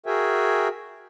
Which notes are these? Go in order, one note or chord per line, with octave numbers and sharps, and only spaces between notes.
F#4 G#4 A#4 E5 G5 G#5